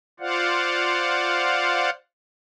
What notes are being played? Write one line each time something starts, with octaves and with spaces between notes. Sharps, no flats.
F4 C5 D5 F5 F#5